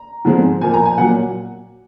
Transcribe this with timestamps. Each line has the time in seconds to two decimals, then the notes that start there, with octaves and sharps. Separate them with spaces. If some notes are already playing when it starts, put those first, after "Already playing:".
Already playing: A#5
0.25 G#2 F3 G#3 C4
0.61 A#2 F3 A#3 G#5
0.74 A#5
0.85 G#5
0.98 A#2 F#3 A#3 F#5